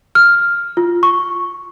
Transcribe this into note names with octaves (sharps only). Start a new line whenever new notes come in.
F6
F4
C#6